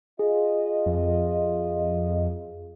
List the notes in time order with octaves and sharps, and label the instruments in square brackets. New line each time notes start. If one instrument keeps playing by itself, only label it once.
[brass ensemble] F4 D#5 [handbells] G#4
[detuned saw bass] F2